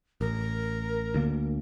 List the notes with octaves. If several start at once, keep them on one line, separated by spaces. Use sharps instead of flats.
A1 A#4
D2 D3 A#3